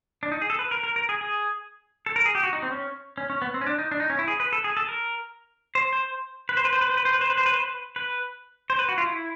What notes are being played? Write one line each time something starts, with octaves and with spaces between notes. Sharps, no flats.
D4
D#4
G#4
A4
B4
A#4
A#4
A#4
G#4
G#4
A4
A#4
G#4
G4
F#4
D#4
C4
C#4
C#4
C#4
B3
C4
C#4
D4
D#4
D4
D#4
C#4
E4
G#4
B4
A4
G#4
A4
A#4
C5
C5
B4
C5
B4
C5
B4
C5
B4
C5
B4
C5
B4
C5
B4
C5
B4
B4
C5
B4
F#4
F4
E4